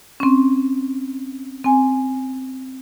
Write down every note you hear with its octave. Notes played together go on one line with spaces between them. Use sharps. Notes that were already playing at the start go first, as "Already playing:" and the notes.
C4 C#4
C4 G#5